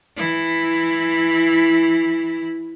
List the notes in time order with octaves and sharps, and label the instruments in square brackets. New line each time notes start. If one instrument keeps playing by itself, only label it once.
[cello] E3 E4